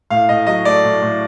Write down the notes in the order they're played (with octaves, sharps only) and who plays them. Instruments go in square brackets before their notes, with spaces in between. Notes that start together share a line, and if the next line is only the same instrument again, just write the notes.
[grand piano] A2 F5
A2 D#5
F#3 D#5
A3 D5
A2
A2